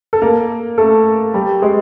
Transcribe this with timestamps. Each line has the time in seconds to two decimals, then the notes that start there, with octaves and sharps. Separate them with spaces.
0.13 A4
0.22 A#3 A#4
0.78 A3 A4
1.34 G3 G4
1.62 G#3 G#4